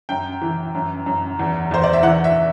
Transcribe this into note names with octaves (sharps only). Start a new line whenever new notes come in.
F#2 G5
E3
F#2
F#2
E2
E2 C5
D5
E5
E3 F#5
E5